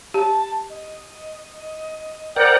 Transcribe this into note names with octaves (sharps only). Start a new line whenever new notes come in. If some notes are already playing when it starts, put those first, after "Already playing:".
G4 A5
D#5
A#4 C5 D5 F#5 G5